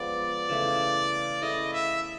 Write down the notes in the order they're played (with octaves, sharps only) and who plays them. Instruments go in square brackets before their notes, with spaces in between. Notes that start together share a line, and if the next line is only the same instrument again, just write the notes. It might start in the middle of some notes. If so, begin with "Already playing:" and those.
Already playing: [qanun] F3 G#3 B3 [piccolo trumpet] D5
[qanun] C#3 E3 A3
[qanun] A3 C#4 E4 G#4 [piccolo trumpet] D#5
[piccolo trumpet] E5